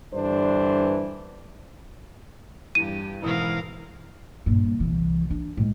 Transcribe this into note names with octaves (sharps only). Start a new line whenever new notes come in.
G2 D3 E3 D4 C5
E2 G2 G4 D#7
F#1 G#2 B2 E3 A#4 F5 D#6
G2 A#2
C2 E3
D4
A2 G#3